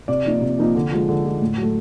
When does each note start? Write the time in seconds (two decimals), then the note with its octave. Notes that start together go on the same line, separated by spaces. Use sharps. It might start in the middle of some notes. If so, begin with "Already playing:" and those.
0.08 C3 D5
0.25 F3 A#3 D#4
0.42 C3
0.59 F3 A#3 D#4
0.75 D3
0.91 F3 G#3
1.09 D3
1.24 F3 G#3
1.41 A2
1.58 F#3
1.63 A3